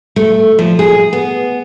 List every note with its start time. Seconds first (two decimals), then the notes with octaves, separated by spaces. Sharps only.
0.16 A3
0.59 F3
0.79 G#4
1.13 B3